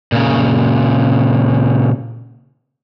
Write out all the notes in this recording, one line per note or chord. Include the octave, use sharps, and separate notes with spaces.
A#2 C#3